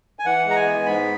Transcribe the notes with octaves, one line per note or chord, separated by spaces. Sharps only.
G#5
E3 F#5
G#3
A#5
G#5
B3
G#2 B5